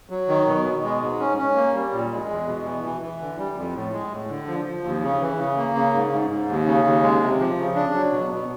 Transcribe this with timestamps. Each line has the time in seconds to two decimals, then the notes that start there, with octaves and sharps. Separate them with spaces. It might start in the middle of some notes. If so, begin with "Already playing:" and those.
0.10 F#3
0.29 D#3
0.47 B2
0.65 B2
0.83 G#3
1.01 G#2
1.20 C#4
1.38 C#4
1.56 A#3
1.74 G3
1.92 A#2
2.11 G#3
2.28 E2
2.46 B2
2.64 E3
2.84 E3
3.01 E3
3.20 D3
3.38 G3
3.56 F2
3.74 A2
3.93 G#3
4.11 A2
4.28 D3
4.47 F3
4.65 F3
4.84 D#2
5.03 C#3
5.20 E3
5.38 C#3
5.56 A#3
5.75 C#3
5.94 G#2
6.11 G#2
6.29 G#2
6.48 D#2
6.66 C#3
6.84 D#2
7.02 G#3
7.21 C3
7.39 F3
7.58 C#3
7.75 D4
7.94 F#3
8.12 B2
8.31 B2